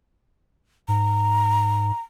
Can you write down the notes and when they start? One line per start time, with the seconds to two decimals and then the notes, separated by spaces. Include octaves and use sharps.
0.88 G#2 A#5